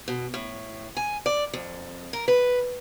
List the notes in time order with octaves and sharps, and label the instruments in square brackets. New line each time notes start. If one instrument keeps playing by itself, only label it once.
[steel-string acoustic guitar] B2
A2
G#5
D5
F2
A#4
B4